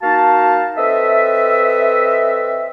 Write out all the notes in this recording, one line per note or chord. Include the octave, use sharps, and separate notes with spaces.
A#3 D#4 F#4 F5 A5
C4 A4 B4 D#5 E5